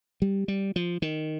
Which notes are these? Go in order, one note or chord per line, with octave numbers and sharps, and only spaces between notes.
G3
G3
F3
D#3